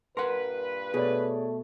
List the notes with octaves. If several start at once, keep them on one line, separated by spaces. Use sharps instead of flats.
G2 A#2 A#4 B4 F#5 C6
B2 A3 G#4 C#5 D5